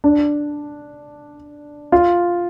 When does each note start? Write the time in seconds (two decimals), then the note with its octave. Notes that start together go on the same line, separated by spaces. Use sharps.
0.04 D4
1.92 F4